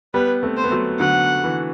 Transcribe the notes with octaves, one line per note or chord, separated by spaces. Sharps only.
G3 B3 B4
A3 C4
C5
B3
F#3 A3
D3 F#3 F#5
E3